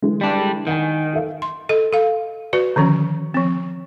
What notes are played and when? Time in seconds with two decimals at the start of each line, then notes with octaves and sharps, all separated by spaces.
0.02 D3 E3 G#3
0.21 G3 D4
0.67 D#3 F#5 G#5
1.13 A4 E5 F5
1.42 C6
1.69 A4 D#5
1.93 A4 F5
2.53 F#4 B4 D5
2.76 D3 D#3 F3 C#4
3.34 F3 C4